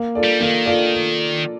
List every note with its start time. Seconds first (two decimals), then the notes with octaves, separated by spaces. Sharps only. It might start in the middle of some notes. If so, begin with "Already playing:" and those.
Already playing: A#3
0.15 F4 A4 D5
0.24 G3
0.40 D#3 A#3
0.66 F4 A4 D5